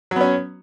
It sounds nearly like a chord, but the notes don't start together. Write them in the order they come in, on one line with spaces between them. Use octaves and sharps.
F#3 B3 C#4